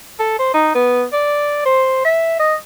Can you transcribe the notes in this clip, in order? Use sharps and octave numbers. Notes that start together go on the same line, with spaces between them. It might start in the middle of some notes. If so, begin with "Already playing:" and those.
A4
C5
D#4
B3
D5
C5
E5
D#5